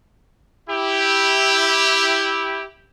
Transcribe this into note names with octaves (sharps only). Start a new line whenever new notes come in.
E4 G4